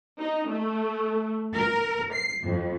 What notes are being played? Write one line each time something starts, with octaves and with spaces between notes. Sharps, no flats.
D#4
A3
A#4
C7
F2